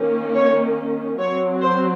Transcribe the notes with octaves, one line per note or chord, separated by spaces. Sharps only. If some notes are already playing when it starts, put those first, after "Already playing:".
Already playing: D#3 A#3 C#4
C#5
F#3 C4 C#5
C5